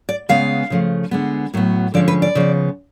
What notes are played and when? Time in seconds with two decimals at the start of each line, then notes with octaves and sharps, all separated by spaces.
0.09 D5
0.29 C#3 G#3 B3 F5
0.70 C#3 F3 A3
1.11 D3 G#3 B3
1.54 A2 F#3 B3
1.94 D3 F3 G#3 C#4 D5
2.08 B4
2.22 D5
2.35 C#3 F3 B3